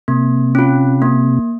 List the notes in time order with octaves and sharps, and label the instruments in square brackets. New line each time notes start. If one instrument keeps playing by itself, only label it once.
[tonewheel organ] C3 [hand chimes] A#3
[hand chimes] C#4 F4
A#3